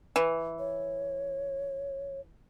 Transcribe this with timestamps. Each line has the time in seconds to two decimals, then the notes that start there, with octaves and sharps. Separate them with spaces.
0.16 E3
0.59 C#5